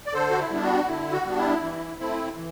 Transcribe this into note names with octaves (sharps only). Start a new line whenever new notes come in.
D5
D3 A4 C5
F#4
E4
G3 B3 D4
F#4
D3 E4
F#4
G3 B3 D4
E4
E3
A3 C4 E4
E3